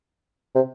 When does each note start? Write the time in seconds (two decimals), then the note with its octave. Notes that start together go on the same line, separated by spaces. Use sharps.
0.55 C3